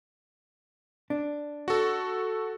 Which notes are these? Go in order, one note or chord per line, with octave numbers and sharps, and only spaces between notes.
D4
F#4 A4